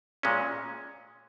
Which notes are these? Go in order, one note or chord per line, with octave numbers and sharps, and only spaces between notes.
A#2 G#3 C#4